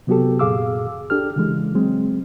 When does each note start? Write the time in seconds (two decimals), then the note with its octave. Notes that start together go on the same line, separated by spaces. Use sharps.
0.07 C3 F#3 B3 F#4 G4 A4
0.39 F#2 A#2 G#4 F5 D6 E6
1.10 D4 G4 A4 F6
1.36 C#3 E3 G#3
1.75 F#3 G#3 C4